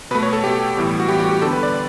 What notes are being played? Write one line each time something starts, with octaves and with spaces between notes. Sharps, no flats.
B2 A3 B4
C#5
A4
B2 A3 G4
A2 E3 G3 B3
F#4
A2 E3 G3 B3 G4
F#4
G4
D3 G3 B3 A4
B4
D5